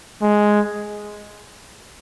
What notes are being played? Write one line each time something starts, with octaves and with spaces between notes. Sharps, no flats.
G#3